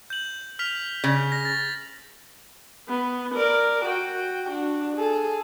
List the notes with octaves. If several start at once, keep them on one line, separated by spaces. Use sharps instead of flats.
G6 F#7
F6 B6 F7
C#3
A#6
A6
B3
A#4 D5
F#4 G5
D4 F#4
G#4 A4